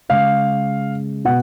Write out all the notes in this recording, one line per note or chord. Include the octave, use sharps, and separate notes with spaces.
C#3 G#3 F5
B2 F#5